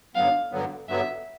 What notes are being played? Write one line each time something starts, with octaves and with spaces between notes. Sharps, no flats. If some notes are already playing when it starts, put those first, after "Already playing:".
G2 D3 F#3 B3 F5
G2 D3 F#3 B3
G2 D3 F#3 B3 E5